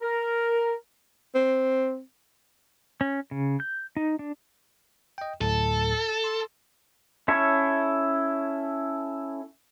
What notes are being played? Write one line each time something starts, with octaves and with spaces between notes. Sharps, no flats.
A#4
C4
C#4
C#3
G6
D#4
D4
D#5 G5
D2 A2 F#3 A4
C6
C#4 E4 A4 C#5